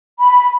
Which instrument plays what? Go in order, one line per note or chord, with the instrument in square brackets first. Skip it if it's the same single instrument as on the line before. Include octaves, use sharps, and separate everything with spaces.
[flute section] B5